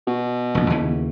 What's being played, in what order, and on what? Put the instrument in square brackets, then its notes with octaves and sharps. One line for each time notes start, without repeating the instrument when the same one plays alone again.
[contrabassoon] B2
[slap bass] F1 A#1
D#2 C#3 E3